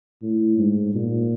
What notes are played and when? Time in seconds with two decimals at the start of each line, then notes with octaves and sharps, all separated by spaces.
0.22 A2
0.58 G#2
0.94 A#2